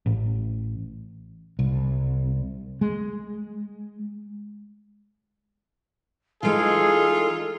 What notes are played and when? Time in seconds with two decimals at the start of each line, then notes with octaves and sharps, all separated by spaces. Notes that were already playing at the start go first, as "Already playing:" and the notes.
0.06 A1
1.59 C2
2.81 G#3
6.43 E3 G#3 A3 D#4 F4 G#4 A4